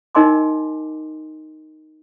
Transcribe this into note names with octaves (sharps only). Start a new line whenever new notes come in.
D#4 A#4 D#5 G#5 C6 D6